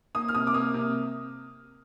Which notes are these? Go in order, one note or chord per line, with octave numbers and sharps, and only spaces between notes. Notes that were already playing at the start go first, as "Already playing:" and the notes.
A#3 D#6
F6
C3 D#6
D6
A#3 D#6
C3